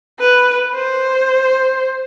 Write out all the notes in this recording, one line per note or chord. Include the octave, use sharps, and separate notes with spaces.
B4
C5